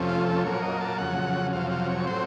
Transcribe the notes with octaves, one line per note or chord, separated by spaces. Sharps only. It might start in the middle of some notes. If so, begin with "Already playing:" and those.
Already playing: F2 C3 F3 A3 C#4
F4
A4
A#2 F#3 A#3 C#5
D#5
A5
F2 C#3 F#3 F#5
F2 C3 F#3 F5
F5
C#5
A2 F#3 C4 C5